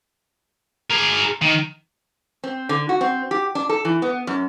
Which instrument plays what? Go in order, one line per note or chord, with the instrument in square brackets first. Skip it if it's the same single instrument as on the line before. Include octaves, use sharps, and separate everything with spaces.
[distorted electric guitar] G#4 A#4
D#3
[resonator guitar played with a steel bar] C4
D3
F#4
C4
G4
D4
A4
E3
B3
F#2